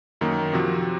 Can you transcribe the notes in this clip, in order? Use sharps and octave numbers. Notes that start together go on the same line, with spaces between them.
F#2 D#3 A#3
C3 F3 C4 F#4